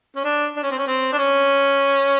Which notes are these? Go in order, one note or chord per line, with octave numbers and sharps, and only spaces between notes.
C#4
D4
D4
C#4
C4
C#4
C4
D4
C#4